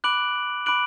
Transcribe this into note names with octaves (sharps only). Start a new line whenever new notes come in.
B5 D6 F#6 D7 F#7
B5 D6 F#6 D7 F#7